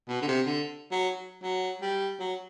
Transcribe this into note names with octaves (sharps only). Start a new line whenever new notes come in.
B2
D3
C3
D3
F#3
F#3
G3
F#3